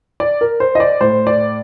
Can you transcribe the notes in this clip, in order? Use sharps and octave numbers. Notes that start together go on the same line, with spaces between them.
D5
A#4
C5
D#5
D5
A2 C5
D5